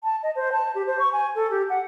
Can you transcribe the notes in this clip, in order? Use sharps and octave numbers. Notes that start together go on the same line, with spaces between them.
A5
D#5
C5
A5
G4
C5
C#6
G#5
A4
G4
F#5